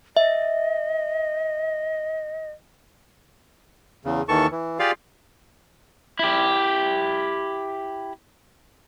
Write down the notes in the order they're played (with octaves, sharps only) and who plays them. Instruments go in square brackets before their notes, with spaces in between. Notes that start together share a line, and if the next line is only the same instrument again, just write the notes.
[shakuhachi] D#5 [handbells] E5
[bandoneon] E2 C#3
D#2 D#3 E3 A4 A5 C#6
E3
F4 G4 G#4 D5 F5
[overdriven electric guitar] E4 G4